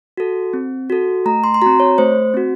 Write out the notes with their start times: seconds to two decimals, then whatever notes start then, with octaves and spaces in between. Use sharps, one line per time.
0.17 F#4 A4
0.53 C4
0.90 F#4 A4
1.25 A3 A#5
1.44 C6
1.54 C6
1.62 C4 F#4 A#5
1.80 C#5
1.98 A3 C5
2.34 C4 F#4